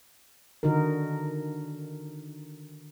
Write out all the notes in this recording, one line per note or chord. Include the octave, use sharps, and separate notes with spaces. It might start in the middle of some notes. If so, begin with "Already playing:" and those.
D3 D#3 D#4 F#4 A#4